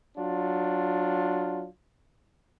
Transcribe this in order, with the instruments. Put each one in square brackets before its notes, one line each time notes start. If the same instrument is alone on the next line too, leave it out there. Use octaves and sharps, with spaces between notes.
[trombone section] F#3 D4 F4